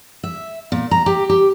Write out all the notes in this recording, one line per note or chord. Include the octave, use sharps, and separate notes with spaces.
E5
A#2
A#5
G4
G4